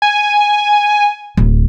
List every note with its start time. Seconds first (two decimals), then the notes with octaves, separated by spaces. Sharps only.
0.02 G#5
1.37 D1